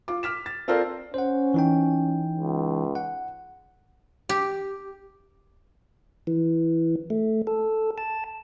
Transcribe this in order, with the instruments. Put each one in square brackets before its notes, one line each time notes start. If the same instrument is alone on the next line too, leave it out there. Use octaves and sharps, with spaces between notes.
[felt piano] F4 D6
D6 F6 B6 E7
A6
C4 F4 A4 A#4 C5 D5
[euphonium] C#4 [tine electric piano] C5 F#5
[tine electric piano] E3 D#4 G5
[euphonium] C#2
[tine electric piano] F#5
[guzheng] G4
[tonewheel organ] E3
A3
A4
A5